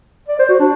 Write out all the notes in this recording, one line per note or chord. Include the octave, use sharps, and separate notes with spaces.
D5
C5
F#4
D4